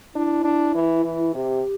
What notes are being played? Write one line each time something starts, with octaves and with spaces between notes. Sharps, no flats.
D4 E4
D4
E3
E3
C3 G4